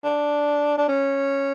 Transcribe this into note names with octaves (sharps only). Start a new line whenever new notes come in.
D4
D4
C#4